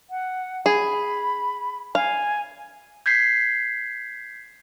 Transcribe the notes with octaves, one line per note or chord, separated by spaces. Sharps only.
F#5
G#4 B5
F5 G#5
G6 G#6 B6 C7